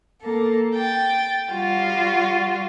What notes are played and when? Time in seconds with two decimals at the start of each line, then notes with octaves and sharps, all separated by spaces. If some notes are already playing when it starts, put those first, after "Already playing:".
0.21 A#3 A4
0.76 G5 A6
1.51 G3 F4 F#4